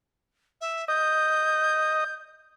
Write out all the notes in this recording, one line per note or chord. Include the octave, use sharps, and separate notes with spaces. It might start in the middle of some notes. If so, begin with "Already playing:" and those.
E5
D#5 G6